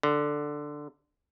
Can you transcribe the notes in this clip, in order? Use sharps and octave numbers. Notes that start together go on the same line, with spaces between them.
D3